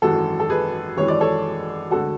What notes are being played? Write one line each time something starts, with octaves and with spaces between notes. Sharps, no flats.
G#1 F#2 E3 G#3 F#4 A4
A4
G#4 B4
G#1 F#2 E3 G#3 C#5
D5
A4 C#5
D2 D3 G#3 F#4 A4